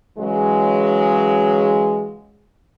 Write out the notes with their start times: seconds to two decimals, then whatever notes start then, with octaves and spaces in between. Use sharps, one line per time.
0.18 C#3 E3 F#3 G#3